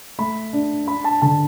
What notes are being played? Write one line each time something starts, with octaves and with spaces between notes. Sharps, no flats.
A3 B5
D4
D4 B5
A5
D3 A5